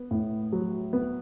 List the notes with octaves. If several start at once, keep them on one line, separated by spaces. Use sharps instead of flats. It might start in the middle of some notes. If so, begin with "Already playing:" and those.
Already playing: B3
A2
F#3
B3